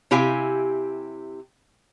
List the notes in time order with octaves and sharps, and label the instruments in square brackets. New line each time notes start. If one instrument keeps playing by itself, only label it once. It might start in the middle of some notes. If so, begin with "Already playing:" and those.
[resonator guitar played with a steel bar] C3 E4 G4 F5 G#5